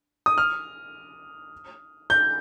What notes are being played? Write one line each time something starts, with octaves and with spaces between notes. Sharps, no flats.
D#6
F6
G6